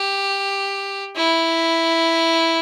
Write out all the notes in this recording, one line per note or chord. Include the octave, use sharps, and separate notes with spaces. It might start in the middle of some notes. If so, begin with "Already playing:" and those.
Already playing: G4
E4